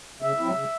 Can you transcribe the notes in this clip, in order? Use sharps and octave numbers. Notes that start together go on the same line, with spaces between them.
C#3 E5
F#3 C4 E4
C#3